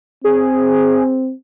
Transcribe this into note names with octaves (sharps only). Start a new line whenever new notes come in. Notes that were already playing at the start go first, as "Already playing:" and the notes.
C4 G#4